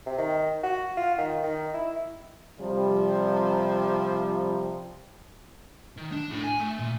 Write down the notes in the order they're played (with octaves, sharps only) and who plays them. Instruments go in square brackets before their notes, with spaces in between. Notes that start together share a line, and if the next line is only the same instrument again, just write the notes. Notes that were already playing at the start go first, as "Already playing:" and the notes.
[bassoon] C3
D#3
F#4
F4
D#3
D#3
E4
[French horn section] C3 F3 G3
[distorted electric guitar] D#3
D4
A2
G#5
A3
A#2